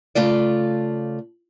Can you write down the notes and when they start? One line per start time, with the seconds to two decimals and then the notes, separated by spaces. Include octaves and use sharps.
0.15 C#3 A3 F4 D5